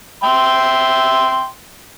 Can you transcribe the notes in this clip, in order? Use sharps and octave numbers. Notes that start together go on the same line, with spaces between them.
E5 G5 C6